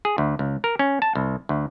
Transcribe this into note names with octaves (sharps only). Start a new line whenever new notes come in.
G#4
D2
C#2
A#4
C#4
A5
C2
D2